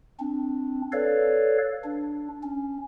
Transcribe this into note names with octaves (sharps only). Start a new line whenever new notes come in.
C4 D4
A4 B4 C#5 D5 F5
D4
C#4